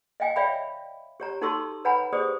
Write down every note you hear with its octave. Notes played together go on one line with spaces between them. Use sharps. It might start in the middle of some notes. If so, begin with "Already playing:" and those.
D#5 F5 G5 G#5
C#5 D5 E5 F5 G5 B5
G4 C#5 A#5
D#4 F#4 A4 C6 C#6 E6
B4 C#5 F#5 G#5 A#5 B5
G4 G#4 C5 D5 D#6